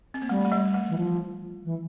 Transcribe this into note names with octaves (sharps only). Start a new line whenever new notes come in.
C4
A#3
G3 A3
A3
G3
A3
E3
F3
E3